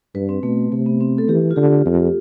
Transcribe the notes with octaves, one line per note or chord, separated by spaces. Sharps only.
G2 B4
C4
B2 A3
C3 A3
B3
C4
A4
E3 G4
F4
D3 G4
F2